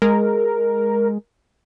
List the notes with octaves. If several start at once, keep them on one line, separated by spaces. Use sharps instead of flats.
G#3 A#4